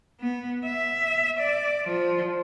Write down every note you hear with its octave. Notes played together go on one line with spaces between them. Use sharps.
B3
E5
D5
F3